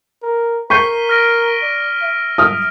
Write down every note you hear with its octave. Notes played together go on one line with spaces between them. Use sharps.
A#4
A#4 C#6 G6 B6 C7 D#7 G7
F6 A#6 D7
D5
E5
D#6 F6